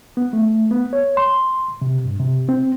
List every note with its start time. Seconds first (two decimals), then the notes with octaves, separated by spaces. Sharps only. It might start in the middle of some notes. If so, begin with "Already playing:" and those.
0.17 B3
0.33 A3
0.71 B3
0.93 C#5
1.17 C6
1.82 C3
2.04 G2
2.20 C3
2.49 C4